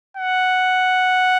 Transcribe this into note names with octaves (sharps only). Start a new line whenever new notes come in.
F#5